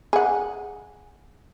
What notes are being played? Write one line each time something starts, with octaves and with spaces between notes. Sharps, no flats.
G#4 F#5